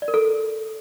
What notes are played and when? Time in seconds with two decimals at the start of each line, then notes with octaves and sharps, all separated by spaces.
0.02 D5
0.08 A#4
0.14 A4